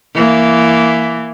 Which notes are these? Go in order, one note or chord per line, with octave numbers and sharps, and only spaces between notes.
E3 A#3